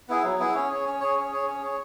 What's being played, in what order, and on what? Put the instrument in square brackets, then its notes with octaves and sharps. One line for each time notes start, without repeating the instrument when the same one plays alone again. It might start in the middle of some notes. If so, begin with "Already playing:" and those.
[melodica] B3 E4 G#4
F#3
B3 E4 G#4
C#4
G#4 C#5
C#4
G#4 C#5
C#4
G#4 C#5
C#4
G#4 C#5